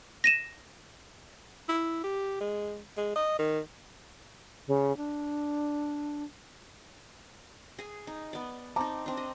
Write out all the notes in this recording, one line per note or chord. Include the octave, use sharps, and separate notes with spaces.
A#6 D#7 E7
E4
G4
G#3
G#3
D#5
D#3
C#3
D4
G#4 G#5
D#4
B3 D5
C4 D#4 A5 A#5 D6
C4 D4
D#5